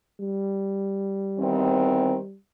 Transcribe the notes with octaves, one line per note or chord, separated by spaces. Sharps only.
G3
E2 D#3 C4